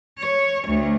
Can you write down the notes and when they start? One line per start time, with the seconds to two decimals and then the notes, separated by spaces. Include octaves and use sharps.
0.19 C#5
0.67 D2